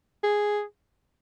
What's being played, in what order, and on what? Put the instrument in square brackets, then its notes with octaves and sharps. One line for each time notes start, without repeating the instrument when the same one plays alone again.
[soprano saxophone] G#4